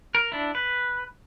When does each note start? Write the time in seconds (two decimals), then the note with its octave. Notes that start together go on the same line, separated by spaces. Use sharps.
0.15 A#4
0.32 D4 E4
0.55 B4